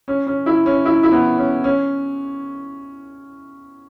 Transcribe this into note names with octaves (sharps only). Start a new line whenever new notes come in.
C#4
C#4
E4
C#4
E4
E4
B3
C#4
C#4